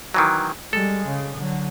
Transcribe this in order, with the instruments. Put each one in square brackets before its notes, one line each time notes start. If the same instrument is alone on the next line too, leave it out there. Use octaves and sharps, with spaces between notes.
[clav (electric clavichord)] D#3 E3 F#3
[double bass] G3 G#3 [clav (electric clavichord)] A4
[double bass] C#3
D3 F#3